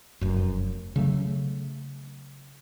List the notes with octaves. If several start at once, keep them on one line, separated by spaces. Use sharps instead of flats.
F1 F#2
C#3 F#3 A3